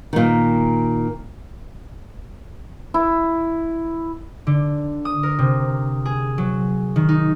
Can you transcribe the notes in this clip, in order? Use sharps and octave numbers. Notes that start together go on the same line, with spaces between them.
A#2 D#3
E4
D3
D#6
A#4
C3
G#4
F#3
D#3
D#4